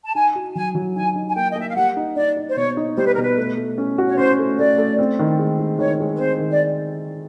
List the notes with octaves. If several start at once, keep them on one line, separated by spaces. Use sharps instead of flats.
A5
D#4 G#5
F#4
F#3 G#5
F#3
D#4 G#5
D#4
G#5
A#3 G5
D#5
A#3 E5
F5
G3 F#5
D#4
D#4 D5
D#4
C5
B2 C#5
D#4
G3 C5
B4
A#4
B2 B4
A3
A3
C#4
F#4
C#5
C#4 C5
A3
A3 D5
A3
C4
D#3
G#3
G#3
D#3 C#5
G#3
B4
C4 C5
D#3
D5